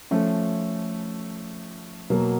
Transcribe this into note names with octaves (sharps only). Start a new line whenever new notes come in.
F3 A3 C#4
B2 F#3 A#3